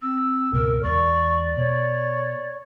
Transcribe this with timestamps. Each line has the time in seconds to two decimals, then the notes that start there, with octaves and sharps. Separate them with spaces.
0.02 C4 E6
0.53 C#2 G#2 B2 A#4
0.83 E2 G#3 D5 C#6
1.57 B2 C#5